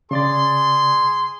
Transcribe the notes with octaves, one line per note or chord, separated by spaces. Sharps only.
C#3 G#4 D5 C6 A6